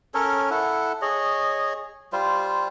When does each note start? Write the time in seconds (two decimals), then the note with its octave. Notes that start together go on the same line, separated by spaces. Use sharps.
0.14 C#4 A4 A#4 C#5
0.51 E4 A4 F#5
1.02 G#4 C#5 D#5
2.13 G3 F4 C5